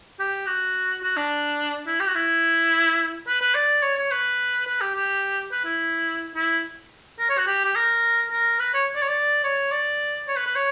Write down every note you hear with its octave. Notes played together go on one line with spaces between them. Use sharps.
G4
F#4
F#4
D4
E4
G4
F#4
E4
B4
B4
D5
C#5
C#5
B4
B4
G4
G4
B4
E4
E4
A#4
C#5
F#4
G4
G4
A#4
A#4
B4
C#5
D5
C#5
D5
C#5
D5
C#5
B4
B4
C#5